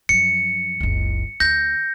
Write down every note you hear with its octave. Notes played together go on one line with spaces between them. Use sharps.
F#2 F3 C#7
F#1 C#2
D2 G6 A#6